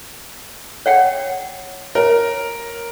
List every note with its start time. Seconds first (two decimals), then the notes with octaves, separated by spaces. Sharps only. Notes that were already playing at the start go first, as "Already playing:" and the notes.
0.86 C#5 F#5 G5
1.95 A#4 C#5